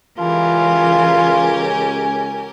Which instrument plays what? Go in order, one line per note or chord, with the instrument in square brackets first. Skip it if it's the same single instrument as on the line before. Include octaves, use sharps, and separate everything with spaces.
[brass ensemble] C#2 G#5 [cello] E3 [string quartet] C#4 G4 A#4 [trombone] F4